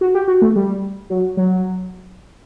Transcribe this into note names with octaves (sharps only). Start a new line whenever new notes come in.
F#4
G4
F#4
A3
G3
F#3
F#3